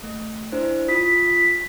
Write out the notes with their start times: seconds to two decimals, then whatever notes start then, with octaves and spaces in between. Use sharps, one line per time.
0.03 A3
0.52 D4 E4 C5
0.88 F4 D#6 B6